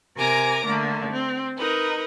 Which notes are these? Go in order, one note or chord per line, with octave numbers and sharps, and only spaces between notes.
C3 A#4 G#5 A#5 D6
D3 A3 A#3
C4
D#4 A#4 B4